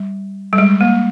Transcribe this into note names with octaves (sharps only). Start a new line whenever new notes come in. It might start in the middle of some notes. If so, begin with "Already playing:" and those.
Already playing: G3
G3
G#3
A#3